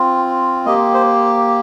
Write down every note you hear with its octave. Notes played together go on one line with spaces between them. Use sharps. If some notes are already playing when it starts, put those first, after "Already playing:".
Already playing: C4 F4
A#3 G4 D#5
C5